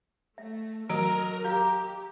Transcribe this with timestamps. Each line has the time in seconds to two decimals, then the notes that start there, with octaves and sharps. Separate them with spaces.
0.38 A3 E5
0.89 F#3 A#4 D#5 A#5 E6 D7
1.45 G4 F5 A#5 G6